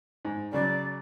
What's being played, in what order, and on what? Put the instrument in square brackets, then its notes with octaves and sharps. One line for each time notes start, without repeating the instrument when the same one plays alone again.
[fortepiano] G#2
[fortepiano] C#3 F#3 [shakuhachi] D5